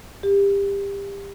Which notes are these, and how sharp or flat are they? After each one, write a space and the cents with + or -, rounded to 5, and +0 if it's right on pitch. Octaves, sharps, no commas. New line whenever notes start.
G4 +25